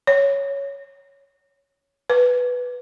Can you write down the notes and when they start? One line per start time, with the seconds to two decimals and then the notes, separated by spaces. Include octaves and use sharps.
0.07 C#5
2.10 B4